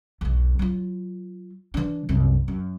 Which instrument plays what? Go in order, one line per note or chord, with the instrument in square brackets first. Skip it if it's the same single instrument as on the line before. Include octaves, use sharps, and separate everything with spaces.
[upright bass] B1 E2
F#3 F4
E3 D4
C2 F#2
F#2